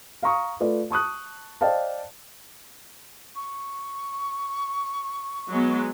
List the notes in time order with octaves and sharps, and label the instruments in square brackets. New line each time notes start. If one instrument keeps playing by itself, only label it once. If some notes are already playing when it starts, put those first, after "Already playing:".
[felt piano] F5 A#5 C#6 D#6
A3 F4 B4 D5
A5 C#6 D#6 F#6
C5 D5 D#5 F5 G5 A5
[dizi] C#6
[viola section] F#3 G#3 B3